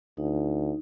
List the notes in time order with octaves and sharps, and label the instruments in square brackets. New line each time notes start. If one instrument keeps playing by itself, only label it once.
[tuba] D2 [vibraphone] D#4